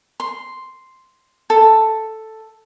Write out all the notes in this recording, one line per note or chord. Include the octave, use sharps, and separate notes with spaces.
C6
A4